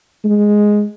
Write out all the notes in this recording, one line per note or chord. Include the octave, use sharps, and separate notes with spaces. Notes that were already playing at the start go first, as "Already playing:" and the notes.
G#3